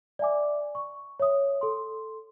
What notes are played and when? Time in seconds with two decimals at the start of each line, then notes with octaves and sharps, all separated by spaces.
0.19 D5 E5 G#5 D6
0.75 C#6
1.20 C#5 E5 D#6
1.61 A4 C6